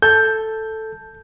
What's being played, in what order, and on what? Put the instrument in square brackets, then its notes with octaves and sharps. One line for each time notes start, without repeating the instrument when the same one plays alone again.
[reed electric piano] A4 A5 [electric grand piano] G6